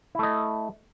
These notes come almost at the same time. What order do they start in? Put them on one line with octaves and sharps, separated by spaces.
E4 A3 D#5